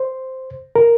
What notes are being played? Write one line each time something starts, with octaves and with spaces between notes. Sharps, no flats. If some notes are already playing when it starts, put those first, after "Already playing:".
Already playing: C5
A#4